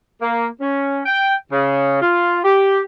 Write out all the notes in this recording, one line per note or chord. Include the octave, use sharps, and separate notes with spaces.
A#3
C#4
G5
C#3
F4
G4